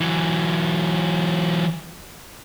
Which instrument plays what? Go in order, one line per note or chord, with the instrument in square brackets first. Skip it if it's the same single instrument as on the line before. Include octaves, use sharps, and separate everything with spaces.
[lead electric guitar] E3 F#3